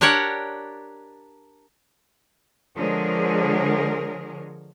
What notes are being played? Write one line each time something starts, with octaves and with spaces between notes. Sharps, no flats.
D4 G4 A#4 C#5 F#5
D3 F3 G#3 G#4 A#4 C#5